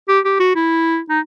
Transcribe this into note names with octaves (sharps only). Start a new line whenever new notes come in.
G4
G4
F#4
E4
D#4